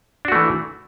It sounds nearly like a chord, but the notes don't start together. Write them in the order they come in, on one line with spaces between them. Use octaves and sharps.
D4 F#4 A3 E3